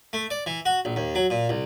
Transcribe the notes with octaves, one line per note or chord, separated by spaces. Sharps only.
A3
D5
E3
F#4
A#1
D#2
F#3
A#2
C2